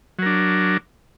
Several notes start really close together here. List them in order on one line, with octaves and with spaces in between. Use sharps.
F#3 A#4 D4